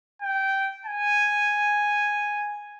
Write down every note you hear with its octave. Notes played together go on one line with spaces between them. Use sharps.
G5
G#5